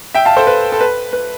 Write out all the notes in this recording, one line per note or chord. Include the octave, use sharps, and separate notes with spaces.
E5 G5
F5 A5
A4 C5
B4
A4
B4
B4